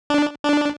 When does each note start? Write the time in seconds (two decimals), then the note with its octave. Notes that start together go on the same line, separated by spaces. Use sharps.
0.10 D4
0.45 D4